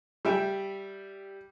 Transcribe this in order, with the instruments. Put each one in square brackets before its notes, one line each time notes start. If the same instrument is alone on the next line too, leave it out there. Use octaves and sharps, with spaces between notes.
[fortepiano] G3 E5 G5